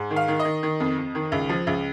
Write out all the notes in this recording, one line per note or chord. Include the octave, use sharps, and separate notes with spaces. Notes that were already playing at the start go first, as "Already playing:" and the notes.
Already playing: G#2
D#3
F5
D#3
D#5
D#3
D#3
F2
F2
D#3
C#2
F3
C#2